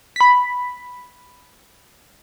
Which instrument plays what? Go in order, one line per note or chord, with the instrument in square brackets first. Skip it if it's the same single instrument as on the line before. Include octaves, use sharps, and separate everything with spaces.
[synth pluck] B5 B6